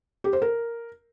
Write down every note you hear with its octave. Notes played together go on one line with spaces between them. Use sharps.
G4
C5
A#4